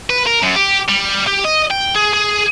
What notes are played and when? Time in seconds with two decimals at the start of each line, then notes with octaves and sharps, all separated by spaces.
0.10 B4
0.26 A#4
0.43 F#2
0.55 G4
0.89 G3
1.27 G4
1.44 D#5
1.70 G5
1.95 G#4
2.13 G#4